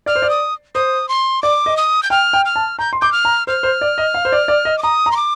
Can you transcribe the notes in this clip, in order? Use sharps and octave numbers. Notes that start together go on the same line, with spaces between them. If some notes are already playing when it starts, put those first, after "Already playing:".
D5 F6
C5
D5
D#6
C5 D#6
C6
D5 D6
D#5
D#6
G6
G5 F6
G5
F6
A5
A#5 G6
C6
D6 G6
F6
A#5
C5 F6
C5
D5
D#5
F5
C5
D5
D5
D#5
D6
A#5 D#6
A#5
C6
D6